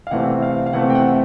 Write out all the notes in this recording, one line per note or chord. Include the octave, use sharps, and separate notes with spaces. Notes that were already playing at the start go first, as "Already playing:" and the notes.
F5
C3 E3 A3 C4 F#5
F5
F5
C3 E3 A3 C4 F#5
G5
F#5